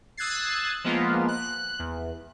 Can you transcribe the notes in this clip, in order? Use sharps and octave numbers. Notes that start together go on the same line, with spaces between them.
D#6 E6 F#6 G#6 A6 C7
F3 G#3 A#3 B3 F4
F#6
E2